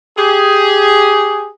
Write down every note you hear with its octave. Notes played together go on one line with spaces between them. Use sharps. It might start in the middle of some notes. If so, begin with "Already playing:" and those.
G4 G#4